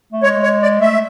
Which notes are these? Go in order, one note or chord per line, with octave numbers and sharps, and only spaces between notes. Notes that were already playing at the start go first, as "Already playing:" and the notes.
A3
G#3 C#5
C#5
D5
A3 E5